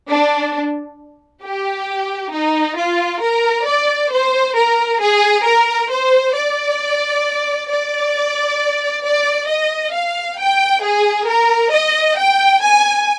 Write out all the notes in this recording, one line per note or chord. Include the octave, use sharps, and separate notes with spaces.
D4
G4
D#4
F4
A#4
D5
C5
A#4
G#4
A#4
C5
D5
D5
D5
D#5
F5
G5
G#4
A#4
D#5
G5
G#5